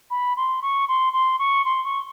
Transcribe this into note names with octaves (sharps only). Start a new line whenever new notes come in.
B5
C6
C#6
C6
C6
C#6
C6
C#6